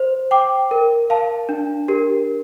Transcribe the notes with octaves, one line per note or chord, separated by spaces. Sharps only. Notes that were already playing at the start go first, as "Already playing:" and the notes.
Already playing: C5
G5 D6
A#4
F5 A5
D4
G4 A#4